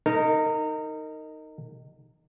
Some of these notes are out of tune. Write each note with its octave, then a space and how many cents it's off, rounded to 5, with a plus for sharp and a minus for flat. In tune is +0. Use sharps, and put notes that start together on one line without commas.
D#4 +0 A#4 -30